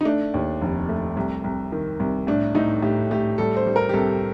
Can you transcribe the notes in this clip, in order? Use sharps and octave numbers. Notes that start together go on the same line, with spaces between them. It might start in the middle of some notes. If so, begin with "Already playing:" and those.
D#4
A3 D4
D#2
F1
A3
C2
C2
D#3
C2
A2 D4
A2 D#4
A2 G4
A2 G4
G3 A4
C5
G3
A#4
G4
C2 A4